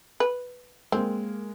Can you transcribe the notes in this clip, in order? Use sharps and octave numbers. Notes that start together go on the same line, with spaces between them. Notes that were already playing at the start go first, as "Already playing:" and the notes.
B4
G#3 A#3 C4